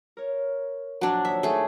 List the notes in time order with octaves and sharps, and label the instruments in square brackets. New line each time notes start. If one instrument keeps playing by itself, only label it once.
[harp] A#4 C#5
[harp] A#1 F2 [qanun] F#3 D4
[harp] D#2 C#5 D#6 [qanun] E5
[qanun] A3 G#4 [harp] D#4 F4 A4